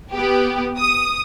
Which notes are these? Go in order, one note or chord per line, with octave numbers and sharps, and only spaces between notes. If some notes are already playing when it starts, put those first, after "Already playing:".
B3 G4
D#6